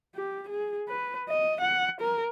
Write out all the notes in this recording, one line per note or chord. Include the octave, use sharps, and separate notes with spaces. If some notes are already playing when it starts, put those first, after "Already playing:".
G4
G#4
B4
D#5
F#5
A#4